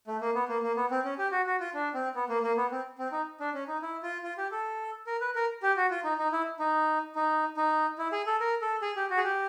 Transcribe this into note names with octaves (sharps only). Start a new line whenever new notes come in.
A3
A#3
B3
A#3
A#3
B3
C4
C#4
G4
F#4
F#4
F4
D4
C4
B3
A#3
A#3
B3
C4
C4
D#4
D4
C#4
D#4
E4
F4
F4
G4
A4
A#4
B4
A#4
G4
F#4
F4
D#4
D#4
E4
D#4
D#4
D#4
E4
G#4
A4
A#4
A4
G#4
G4
F#4
G#4
G4